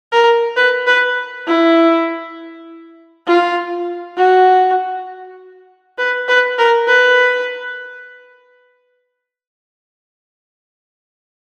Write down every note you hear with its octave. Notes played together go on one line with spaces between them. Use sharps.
A#4
B4
B4
E4
F4
F#4
B4
B4
A#4
B4